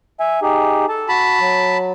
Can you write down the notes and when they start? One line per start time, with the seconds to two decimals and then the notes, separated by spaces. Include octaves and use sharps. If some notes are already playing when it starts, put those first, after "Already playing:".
0.20 E5 G#5
0.42 D#4 G4 G#4
0.89 A4 A5
1.09 F#4 A5 B5
1.40 F#3